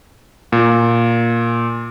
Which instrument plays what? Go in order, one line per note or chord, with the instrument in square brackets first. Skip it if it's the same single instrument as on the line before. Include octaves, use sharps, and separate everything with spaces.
[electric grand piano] A#2